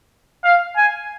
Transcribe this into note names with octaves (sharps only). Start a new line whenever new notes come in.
F5
G#5